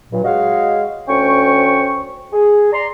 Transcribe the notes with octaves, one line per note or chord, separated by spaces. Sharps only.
G2 A#2 F#3
G#3 F#4 C#5 D#5 F5
D2 C#4 C5 G5 C#6
G#4
D5 A#5 C6